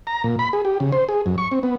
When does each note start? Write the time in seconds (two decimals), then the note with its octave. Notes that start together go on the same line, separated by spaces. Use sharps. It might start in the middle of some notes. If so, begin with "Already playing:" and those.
0.07 A#5
0.24 A#2
0.39 B5
0.53 G#4
0.65 G4
0.80 C#3
0.92 C5
1.09 G#4
1.26 F#2
1.38 C#6
1.52 C4
1.63 B3